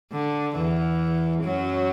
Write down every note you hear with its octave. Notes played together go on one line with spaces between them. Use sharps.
D3
E2 E3
F#2 F#3